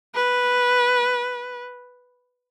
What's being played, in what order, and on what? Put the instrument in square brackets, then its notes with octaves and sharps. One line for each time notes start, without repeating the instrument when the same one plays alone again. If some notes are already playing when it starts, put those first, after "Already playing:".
[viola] B4